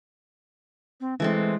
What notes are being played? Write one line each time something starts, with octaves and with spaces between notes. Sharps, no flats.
C4
E3 G#3 A3 C4